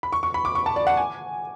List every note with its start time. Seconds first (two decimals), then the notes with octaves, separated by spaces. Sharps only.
0.03 B5
0.12 C#6
0.23 C#6
0.34 B5
0.45 D6
0.55 C#6
0.66 A5
0.76 D5
0.87 F#5
0.97 G#5